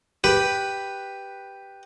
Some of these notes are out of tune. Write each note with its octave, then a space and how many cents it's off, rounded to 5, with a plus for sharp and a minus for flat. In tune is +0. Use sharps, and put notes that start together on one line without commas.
G4 +0 B4 +0